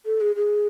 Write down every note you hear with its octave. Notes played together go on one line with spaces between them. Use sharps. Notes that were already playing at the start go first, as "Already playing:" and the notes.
A4
G#4
G#4